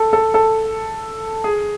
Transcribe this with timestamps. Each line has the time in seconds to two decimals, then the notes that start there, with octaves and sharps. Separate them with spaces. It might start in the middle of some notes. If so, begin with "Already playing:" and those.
Already playing: A4
0.13 A4
0.34 A4
1.44 G#4